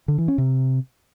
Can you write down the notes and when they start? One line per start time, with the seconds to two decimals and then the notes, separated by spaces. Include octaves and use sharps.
0.08 D3
0.18 E3
0.28 C#4
0.38 C3